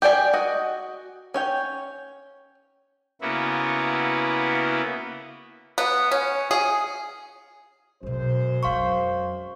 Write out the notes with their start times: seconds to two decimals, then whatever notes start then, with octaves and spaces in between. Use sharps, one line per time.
0.02 G4 G#4 D5 G#5
0.33 F#4 D#5
1.34 C#4 C#5 G5
3.21 C#3 A#3 B3 E4 F#4
5.78 B3
6.11 C#4
6.51 G#4
8.03 F#2 B2 G#3 C#4 C5
8.63 F2 F#3 F5 C6 C#6